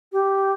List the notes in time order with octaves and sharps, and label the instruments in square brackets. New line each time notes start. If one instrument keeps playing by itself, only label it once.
[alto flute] G4